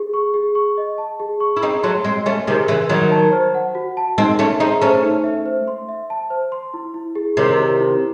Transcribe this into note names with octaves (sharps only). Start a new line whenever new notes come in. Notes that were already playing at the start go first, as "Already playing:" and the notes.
Already playing: G#4
C#6
G#4
C#6
D#5
A5
G#4
C#6
E4
C4 D#4 G#4
F#3 A3 C6
G#3 C4 D#5
A3 C#4 G#5
C3 D#3 G#4
C#3 E3 C6
D#3 F#3 F#4
A5
C5
F#5
F#4
A5
G#3 C4 D#4
A3 C#4 E5
C4 D#4 G#4
A3 C#4 C5
D#4
E5
C5
C6
E5
A5
C5
C6
E4
E4
G#4
C3 D#3 C#5
E4
E4